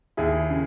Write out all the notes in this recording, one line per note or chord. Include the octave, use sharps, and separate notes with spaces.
D#2 E4 G#4
C#3